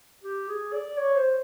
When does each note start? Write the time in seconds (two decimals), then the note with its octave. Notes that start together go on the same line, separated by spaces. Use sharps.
0.24 G4
0.48 G#4
0.73 D5
0.97 C#5
1.16 C5